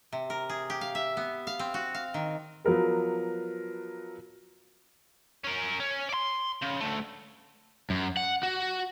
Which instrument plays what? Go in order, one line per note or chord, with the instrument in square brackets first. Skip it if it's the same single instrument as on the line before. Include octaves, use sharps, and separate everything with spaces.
[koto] C3
A#4
G#4
G4
F5
E5
B3
F5
C4
F#4
F5
D#3
[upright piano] F3 F#3 B3 A#4 B4
[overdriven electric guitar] C#4 A#4
C#4
D5 C6
C#3
D2 A3
F#2
F#5
F#4